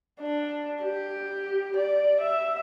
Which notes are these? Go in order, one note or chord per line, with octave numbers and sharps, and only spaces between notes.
D4
G4
D5
E5